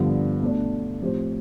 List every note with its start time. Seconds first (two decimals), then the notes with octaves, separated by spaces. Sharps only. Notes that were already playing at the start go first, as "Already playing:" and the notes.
Already playing: G2 D3 F3 B3
0.41 B2 A3 D4
1.01 A2 F3 C4 G4 C5